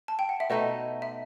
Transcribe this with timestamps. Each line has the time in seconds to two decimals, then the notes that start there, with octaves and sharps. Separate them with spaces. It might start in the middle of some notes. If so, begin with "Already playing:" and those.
0.08 A5
0.19 G5
0.29 F#5
0.40 E5
0.50 B2 A3 D#4 D#5
1.02 E5